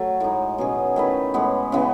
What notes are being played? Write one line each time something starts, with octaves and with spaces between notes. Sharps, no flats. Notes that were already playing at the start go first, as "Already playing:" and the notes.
Already playing: F#3 A3
A2 G#3 D#4
B2 F#3 C#4 G#4
D#3 A3 E4 B4
A2 G#3 B3
C#3 E3 B3